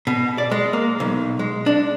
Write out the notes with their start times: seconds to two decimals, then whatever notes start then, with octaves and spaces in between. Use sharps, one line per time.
0.07 B2
0.38 D5
0.51 G#3
0.73 A#3
1.00 B1
1.39 G#3
1.66 D4